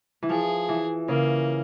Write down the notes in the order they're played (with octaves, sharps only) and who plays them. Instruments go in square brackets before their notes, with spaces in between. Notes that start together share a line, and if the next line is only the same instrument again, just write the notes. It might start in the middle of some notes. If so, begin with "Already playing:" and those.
[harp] E3
[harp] F3 [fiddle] G#4
[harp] E3
[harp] C#3 [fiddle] A#3